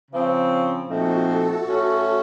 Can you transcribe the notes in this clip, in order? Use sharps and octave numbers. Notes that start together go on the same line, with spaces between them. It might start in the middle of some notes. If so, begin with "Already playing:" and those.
C#3 F3 C4
A#2 F3 A3 C4 D#4 F#4
A4
A2 A3 C#4 F#4